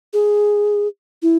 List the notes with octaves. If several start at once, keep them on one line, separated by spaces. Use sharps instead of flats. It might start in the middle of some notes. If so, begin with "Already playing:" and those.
G#4
E4